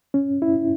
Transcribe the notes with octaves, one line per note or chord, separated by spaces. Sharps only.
C#4
E4